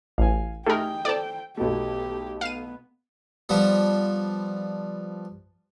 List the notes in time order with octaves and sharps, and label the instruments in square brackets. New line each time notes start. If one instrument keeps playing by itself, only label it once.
[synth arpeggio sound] A1 [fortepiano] F5 G#5
[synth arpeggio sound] A3 A#4 [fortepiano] D#4 G4 G#4 [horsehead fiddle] G5
[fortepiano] A4 C5 [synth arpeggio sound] D5 A5
[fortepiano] B1 B2 A3 [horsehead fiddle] G4
[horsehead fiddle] B3 [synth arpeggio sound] F5 D#7
[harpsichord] F3 G3 B3